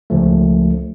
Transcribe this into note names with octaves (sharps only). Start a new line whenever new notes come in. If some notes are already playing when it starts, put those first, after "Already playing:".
C#2 F3 A3